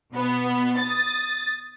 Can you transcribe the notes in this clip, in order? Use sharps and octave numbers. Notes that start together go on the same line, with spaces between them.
B2 B3
D#6 A6